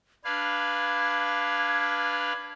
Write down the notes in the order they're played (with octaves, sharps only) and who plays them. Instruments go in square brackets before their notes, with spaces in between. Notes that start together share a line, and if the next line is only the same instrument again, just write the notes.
[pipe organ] D4 B4 F5 [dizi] G#6